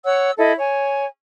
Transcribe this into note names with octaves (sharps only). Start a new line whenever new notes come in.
C#5 F#5 E6
E4 A4 D#5
C#5 G#5